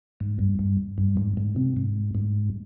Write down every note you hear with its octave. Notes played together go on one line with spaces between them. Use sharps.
G#2
G2
G2
G2
G#2
G#2
C3
G#2
G#2